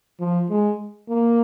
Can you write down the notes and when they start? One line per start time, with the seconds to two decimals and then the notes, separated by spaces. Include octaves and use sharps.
0.20 F3
0.50 G#3
1.09 A#3